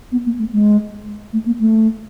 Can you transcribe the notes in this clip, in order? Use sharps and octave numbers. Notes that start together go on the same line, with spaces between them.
B3
A#3
A3
G#3
A3
A#3
A3